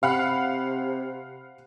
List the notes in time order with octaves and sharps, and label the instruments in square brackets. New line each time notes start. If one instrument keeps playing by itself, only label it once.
[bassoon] C3 [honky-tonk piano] F5 F#5 B5